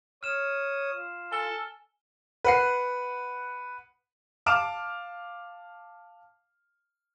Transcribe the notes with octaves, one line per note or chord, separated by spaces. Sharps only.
C#5 D#6 F6 E7
F4
A4 G#5 G7
B4 F#5 C7
F5 A5 D6 F6 D7 E7